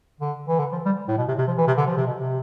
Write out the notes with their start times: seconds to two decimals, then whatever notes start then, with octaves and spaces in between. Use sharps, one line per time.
0.21 D3
0.48 E3
0.59 D3
0.73 F3
0.86 G3
1.08 A2
1.18 B2
1.28 C3
1.38 C3
1.48 F3
1.58 E3
1.67 C3
1.77 D3
1.87 F3
1.97 C3
2.07 B2
2.17 C3